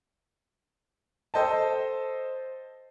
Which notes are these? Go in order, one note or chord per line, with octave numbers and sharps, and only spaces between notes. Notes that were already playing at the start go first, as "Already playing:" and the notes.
A4 C5 D#5 G5 A5